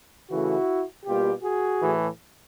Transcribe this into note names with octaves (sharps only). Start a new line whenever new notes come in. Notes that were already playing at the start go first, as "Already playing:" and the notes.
C#3 E3 A3 E4 F#4
B2 G3 A#3 F4 G4
F#4 G#4
A2 E3 A3